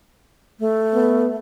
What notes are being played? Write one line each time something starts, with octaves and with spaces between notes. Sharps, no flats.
A3
B3